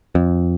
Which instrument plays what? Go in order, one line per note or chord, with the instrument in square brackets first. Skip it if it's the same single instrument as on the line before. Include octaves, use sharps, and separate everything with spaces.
[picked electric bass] F2